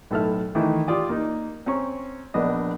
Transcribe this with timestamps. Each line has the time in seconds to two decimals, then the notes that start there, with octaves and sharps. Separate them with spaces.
0.11 B1 A2 A4 E5 F6
0.55 D#3 E3 A3 D#4 E4
0.88 F4 G4 D5 G5 D#6
1.09 A#3 D#4
1.66 C4 C#4 A#5 C#6
2.34 A#1 B3 D4 D#5